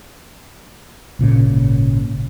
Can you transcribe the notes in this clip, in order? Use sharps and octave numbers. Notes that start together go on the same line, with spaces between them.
G#1 A#2 C#3